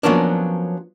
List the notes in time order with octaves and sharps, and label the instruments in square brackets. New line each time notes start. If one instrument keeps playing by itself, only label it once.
[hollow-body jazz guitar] F3 F#3 A#3 B3 C#4 D4